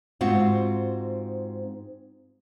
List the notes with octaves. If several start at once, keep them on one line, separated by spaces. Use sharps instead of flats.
G#2 C4 F4 F#4